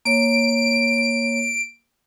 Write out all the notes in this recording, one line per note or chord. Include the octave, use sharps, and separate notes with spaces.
A#3 C#5 D7